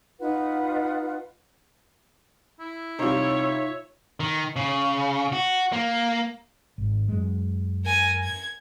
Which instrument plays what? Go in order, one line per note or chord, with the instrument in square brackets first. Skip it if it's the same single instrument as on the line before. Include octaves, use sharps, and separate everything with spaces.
[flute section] D#4 F4 B4 F#5
[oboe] E4
[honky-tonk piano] C3 G3 [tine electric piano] D#4 F4 [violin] C#5
[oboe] E5
[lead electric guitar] D#3
C#3
F#4
A#3
[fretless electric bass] G#1
F#2 G#3
[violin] A#4 G#5
G#6